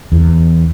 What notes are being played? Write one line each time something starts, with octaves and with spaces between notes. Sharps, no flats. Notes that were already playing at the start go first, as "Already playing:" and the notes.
E2